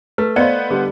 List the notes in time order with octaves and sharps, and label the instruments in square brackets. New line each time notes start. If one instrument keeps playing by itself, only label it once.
[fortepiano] A3 [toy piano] B4
[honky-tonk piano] B3 C5 [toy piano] D5 D#5 F5
[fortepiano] D3 G3